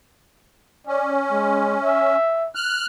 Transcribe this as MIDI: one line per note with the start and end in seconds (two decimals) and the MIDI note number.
0.87 2.16 61
0.87 1.14 74
1.31 1.77 56
1.84 2.49 76
2.55 2.86 89
2.55 2.86 90